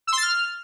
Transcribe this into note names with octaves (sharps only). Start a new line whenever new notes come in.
E6
C6
A6
F6